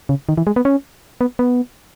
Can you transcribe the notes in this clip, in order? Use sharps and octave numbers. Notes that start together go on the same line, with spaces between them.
C#3
D#3
E3
G#3
B3
C#4
B3
B3